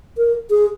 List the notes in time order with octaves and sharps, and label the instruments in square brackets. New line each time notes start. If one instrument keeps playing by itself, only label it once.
[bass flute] A#4
G#4